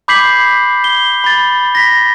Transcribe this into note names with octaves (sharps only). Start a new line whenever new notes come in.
B5 D6 G6 B6 C7 F#7
G7
B5 A6
A#6 B6